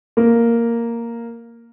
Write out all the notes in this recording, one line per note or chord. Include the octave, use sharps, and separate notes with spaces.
A#3